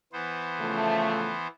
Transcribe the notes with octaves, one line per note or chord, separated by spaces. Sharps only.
E3 B3 C5
C#3 F3 A3